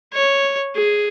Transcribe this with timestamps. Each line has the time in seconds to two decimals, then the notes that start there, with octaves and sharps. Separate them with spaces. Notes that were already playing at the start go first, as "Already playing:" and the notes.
0.14 C#5
0.76 G#4